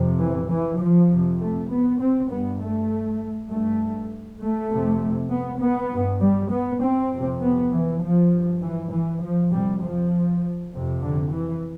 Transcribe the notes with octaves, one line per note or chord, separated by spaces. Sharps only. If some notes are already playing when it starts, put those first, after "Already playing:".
Already playing: F2 C3
E3
E3
F3
F2 C3
A3
B3
C4
G2 B3
A3
G2 A3
A3
F2 C3
B3
B3
G2
G3
B3
C4
F2 C3
B3
E3
F3
G2
E3
E3
F3
F2 C3 G3
F3
F2 C3
D3
E3